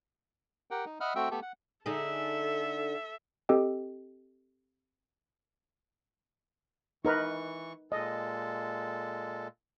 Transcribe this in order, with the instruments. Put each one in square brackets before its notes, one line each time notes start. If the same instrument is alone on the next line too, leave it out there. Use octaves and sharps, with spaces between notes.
[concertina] G4 A#4 F#5 G5
D#4
D#5 E5 F#5 B5 F6
A3 C4 F#4 E5 G5 E6
A3 B3 G4 A4 E5
F#5
[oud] D3 D#4 G#4 [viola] A4 E5
[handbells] C4 G4 A4 D#5 G5
[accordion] E3 C#6 [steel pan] D#4 A#4 B4
[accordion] A#2 G#3 A4 [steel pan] D#5